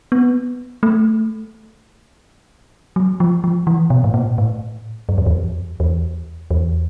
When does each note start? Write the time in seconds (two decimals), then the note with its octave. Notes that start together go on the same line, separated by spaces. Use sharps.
0.12 B3
0.83 A3
2.96 F#3
3.20 F3
3.44 F3
3.67 E3
3.90 B2
4.04 A2
4.14 A#2
4.38 A2
5.09 F#2
5.18 F2
5.27 E2
5.36 F2
5.80 E2
6.51 E2